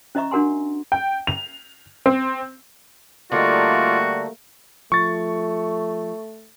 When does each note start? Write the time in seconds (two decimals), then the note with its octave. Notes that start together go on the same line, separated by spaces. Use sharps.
0.15 C#4 E4 D#5 E5 A#5 C#6
0.31 D4 F#4 A#4 F#5 G#5 C6
0.92 G5
1.27 F7
2.06 C4
3.32 D3 G3 A3 A#3 D#4 F4 F#4 D5
4.92 F3 A3 C#6 A6